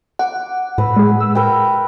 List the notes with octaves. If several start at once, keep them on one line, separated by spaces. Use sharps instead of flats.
F#5 D6
A2 B4 E6
G#3 G#4
E6
A#4 B4 G5